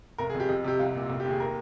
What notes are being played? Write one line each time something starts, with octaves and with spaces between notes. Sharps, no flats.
F1 A#4
G#4
F2
G4
F2
C3 G4
C2 F4
A#2
F1
G4
D#2
G#4
A#4